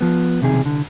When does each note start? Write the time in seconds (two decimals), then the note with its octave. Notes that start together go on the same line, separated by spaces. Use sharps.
0.01 F3 B3
0.41 B1 F2 C3 D#3 G#4
0.62 C2 D3